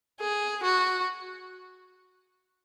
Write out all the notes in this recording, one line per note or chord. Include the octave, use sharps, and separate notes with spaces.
G#4
F#4